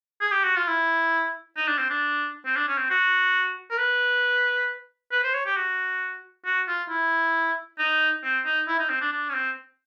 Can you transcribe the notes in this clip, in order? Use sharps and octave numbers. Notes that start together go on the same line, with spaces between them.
G#4
G4
F#4
F4
E4
D#4
D4
C4
D4
C4
D4
C#4
C4
F#4
A#4
B4
B4
C5
C#5
G4
F#4
F#4
F4
E4
D#4
C4
D#4
E4
D#4
C4
D4
D4
C#4
C4